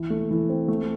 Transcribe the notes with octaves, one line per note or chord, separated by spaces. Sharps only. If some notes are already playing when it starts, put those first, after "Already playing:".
Already playing: E3
A3
E3
C4
A3